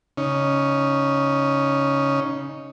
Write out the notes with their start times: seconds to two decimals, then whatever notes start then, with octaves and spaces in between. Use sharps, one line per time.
0.17 C#3 C#4 D#4